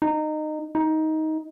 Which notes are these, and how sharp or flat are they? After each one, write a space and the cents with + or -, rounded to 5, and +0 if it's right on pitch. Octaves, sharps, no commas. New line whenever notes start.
D#4 -20
D#4 +15